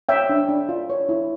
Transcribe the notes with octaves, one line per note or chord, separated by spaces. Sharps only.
C#5 E5 G5
D4
D4
F4
C#5
E4